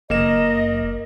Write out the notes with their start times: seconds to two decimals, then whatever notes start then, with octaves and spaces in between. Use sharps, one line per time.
0.10 F#1 A#3 A#4 D#5 E7